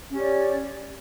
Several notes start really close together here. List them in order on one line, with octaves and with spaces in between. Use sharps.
C#4 G4 C#5 D5